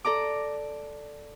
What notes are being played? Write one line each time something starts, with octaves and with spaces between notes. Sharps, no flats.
A4 D5 A#5 D6